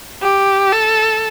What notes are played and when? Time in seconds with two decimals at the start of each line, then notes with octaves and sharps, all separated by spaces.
0.22 G4
0.73 A4